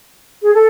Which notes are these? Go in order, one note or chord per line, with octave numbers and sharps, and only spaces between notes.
G#4
A4